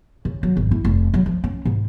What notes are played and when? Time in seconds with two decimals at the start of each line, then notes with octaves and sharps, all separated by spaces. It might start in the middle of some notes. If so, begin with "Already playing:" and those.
0.25 C#3
0.43 F#3
0.57 G#1
0.71 E4
0.85 F1
1.14 F#3
1.26 F3
1.44 C#4
1.65 G#2